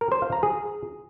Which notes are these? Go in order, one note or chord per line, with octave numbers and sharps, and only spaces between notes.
A#4
C5
F5
A#5
G#4